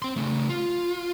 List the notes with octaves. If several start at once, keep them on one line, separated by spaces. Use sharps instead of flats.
C4 C6
C#3 A3
F4